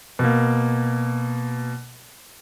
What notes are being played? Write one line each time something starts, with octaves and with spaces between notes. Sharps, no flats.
B2 A#3